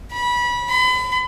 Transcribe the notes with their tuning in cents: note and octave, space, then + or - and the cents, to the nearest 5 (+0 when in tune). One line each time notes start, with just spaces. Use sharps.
B5 -25
B5 +35